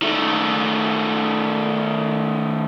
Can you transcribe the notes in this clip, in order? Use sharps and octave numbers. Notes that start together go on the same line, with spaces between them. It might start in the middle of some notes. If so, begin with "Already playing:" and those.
D#3 A3